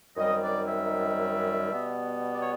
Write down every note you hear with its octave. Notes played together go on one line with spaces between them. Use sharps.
F#2 D#3 G3 C4 D#4 D#5
D5
E5
B2 G3 B3
D5
C#5